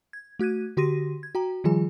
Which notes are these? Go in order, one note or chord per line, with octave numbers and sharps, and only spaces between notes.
G#6
A3 F#4 F#6 G#6 D#7
D3 F#4 G4 C6 A#6 D#7
G#6
F#4 G5 A#5
D#3 F3 G3 F4 G#4 G#5